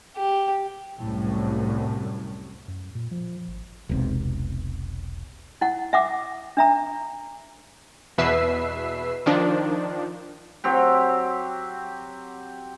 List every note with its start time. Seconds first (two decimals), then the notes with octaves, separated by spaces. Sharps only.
0.17 G4
1.00 C2 F#2 A2
2.68 F#2
2.95 A#2
3.11 F3
3.48 G#1
3.89 E1 B1 C3
5.61 E4 F#5
5.93 E5 F#5 D6
6.57 D4 E5 A#5
8.18 E2 B2 B4 E5 E6 C7
9.26 D#3 F3 D4
10.64 F#3 C4 G4